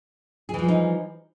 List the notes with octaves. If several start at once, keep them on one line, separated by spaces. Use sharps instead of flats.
E3 F3 G3 D#4 G#4